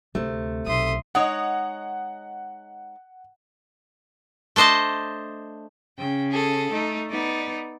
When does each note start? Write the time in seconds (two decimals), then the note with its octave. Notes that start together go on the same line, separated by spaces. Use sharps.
0.15 D2 C3 A3
0.66 B1 E5 C6 D#6
1.15 G#3 D#4 C#5 F#5
4.56 A3 D4 C5 D#5 A5
5.98 C#3 G5
6.31 G#4 A4
6.72 A3 D#4
7.10 B3 D#4 D5